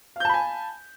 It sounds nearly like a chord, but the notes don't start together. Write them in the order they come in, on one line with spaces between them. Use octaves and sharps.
F5 G6 A5 B5 G#5